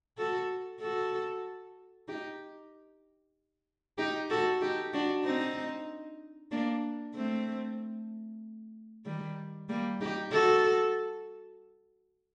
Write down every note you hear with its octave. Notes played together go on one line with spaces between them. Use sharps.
F#4 A4
F#4 A4
D#4 G4
D#4 G4
F#4 A4
D#4 G4
D4 F#4
C4 D#4
A#3 D4
A3 C4
D#3 G3
G3 A#3
D#4 G4
F#4 A4